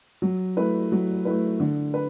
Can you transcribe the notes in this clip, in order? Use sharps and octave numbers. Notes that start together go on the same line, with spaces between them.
F#3
A3 E4 B4
F#3
A3 E4 B4
D3
B4